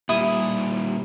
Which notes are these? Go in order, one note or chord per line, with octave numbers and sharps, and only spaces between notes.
A#2 G3 E4 D#6